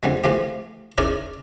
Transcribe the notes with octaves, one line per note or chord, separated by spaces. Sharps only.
F2 D3 G3 G#3
E3 F3 G#3 A3 G4
C#4 D#4 E4 G#4 A#4 D5